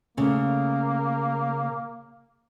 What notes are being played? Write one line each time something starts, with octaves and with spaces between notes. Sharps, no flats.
C#3 A3 A#3